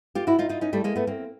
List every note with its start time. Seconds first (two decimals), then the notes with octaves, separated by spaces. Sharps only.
0.15 F4 G4
0.27 E4 F#4
0.39 D#4 F4
0.49 D#4 F4
0.61 C#4 D#4
0.73 G3 A3
0.84 G#3 A#3
0.96 A3 B3
1.07 A#3 C4